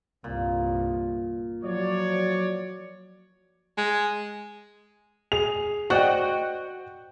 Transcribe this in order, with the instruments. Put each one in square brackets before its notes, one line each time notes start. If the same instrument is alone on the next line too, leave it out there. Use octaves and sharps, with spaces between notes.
[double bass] C2 G2 [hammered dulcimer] A#2
[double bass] F3 [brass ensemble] F#3 C#5 D5
[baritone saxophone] G#3
[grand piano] G#4 [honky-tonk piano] F7
[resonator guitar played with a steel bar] F#4 [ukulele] C5 D5 D#5 [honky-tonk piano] G5 F#6 [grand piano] C#6